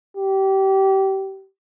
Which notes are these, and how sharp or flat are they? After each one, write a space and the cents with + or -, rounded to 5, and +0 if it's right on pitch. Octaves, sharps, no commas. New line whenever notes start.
G4 -25